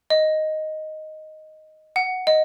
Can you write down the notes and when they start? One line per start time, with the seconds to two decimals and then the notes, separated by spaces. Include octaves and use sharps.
0.10 D#5
1.96 F#5
2.27 D#5